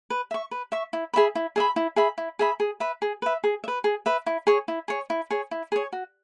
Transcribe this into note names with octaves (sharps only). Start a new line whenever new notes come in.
B4
E5 C#6
B4
E5 C#6
E4
G#4 E5 B5
E4
G#4 E5 B5
E4
G#4 E5 B5
E4
G#4 E5 B5
G#4
B4 E5
G#4
B4 E5
G#4
E5
B4
G#4
B4 E5
E4
G#4 C#5
E4
G#4 C#5
E4
G#4 C#5
E4
G#4 C#5
F#4